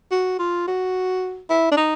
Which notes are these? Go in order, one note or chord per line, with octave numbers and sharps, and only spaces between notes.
F#4
F4
F#4
E4
D4
D#4